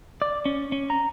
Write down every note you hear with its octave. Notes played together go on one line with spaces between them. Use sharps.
D5
C#4
C#4
A#5